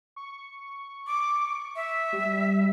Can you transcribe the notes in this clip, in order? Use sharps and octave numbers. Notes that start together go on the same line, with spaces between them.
C#6
D6
E5
G3